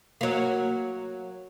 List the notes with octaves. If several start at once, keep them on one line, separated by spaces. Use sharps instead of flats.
F#3 A#3